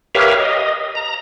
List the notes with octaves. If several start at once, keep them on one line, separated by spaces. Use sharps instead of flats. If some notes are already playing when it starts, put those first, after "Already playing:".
G4 A#4 B4 C#5 E5 F5
D#5
A#5